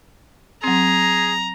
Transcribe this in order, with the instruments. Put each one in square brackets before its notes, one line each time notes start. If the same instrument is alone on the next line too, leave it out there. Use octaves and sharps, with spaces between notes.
[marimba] F#3 C4 [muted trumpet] G#4 [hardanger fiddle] A#5